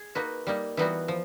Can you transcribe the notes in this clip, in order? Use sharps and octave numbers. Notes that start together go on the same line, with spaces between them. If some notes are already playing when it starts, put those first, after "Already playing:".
Already playing: G#4
A#3 D#4 F#4 B4
G3 A#3 D#4
E3 G3 B3 D#4 F#4
F3